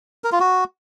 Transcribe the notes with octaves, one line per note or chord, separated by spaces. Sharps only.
A#4
F4
F#4